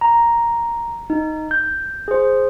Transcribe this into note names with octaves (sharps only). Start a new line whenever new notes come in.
A#5
D#4
G6
G#4 C5